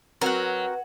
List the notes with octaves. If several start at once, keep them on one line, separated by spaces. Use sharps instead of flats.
F#3 C4 F#4 A#4 B4 F#5